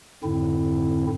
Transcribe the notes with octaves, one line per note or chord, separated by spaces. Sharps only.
F2 G#2 D3 C4 E4